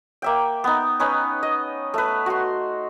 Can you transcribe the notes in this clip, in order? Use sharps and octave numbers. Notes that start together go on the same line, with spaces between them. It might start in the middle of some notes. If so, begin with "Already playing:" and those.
A#3 E5 G5
B3 D#4
C#4 D#4 B4 C#5
D#5
A3 B4
F#4 C6